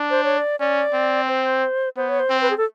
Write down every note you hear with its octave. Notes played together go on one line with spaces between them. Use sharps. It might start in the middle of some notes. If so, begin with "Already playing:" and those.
Already playing: D4
C5
C#5
D5
C#4 D5
C4
C5
B3 C5
C#5
C5
C4
B4
G#4
A4